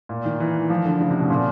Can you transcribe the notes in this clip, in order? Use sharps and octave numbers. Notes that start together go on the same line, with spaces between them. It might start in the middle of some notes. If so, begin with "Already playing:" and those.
A#2
D#3
E3
F3
D3
C#3
C3
B2
A#2